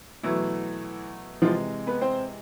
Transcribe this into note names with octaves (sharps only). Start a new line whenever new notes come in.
B2 E3 F#3 A3 E4
C3 E3 F3 G#3 F4
B3 B4
C4 C5